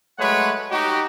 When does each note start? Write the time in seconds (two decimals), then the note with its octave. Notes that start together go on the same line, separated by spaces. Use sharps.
0.19 F#3 G#3 A3 B4 C#5 F#5
0.71 D#4 F#4 G4